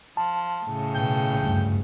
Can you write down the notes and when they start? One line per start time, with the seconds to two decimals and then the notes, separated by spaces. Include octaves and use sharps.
0.17 F3 A5
0.66 A2 C#3
0.95 B2 G5
1.39 F#1 D2 G2